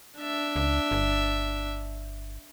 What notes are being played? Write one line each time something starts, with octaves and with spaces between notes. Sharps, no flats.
D4 E5
C#2
G1